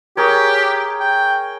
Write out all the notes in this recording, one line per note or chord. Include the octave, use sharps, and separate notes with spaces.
G4 G#4 A#4 C#5
G5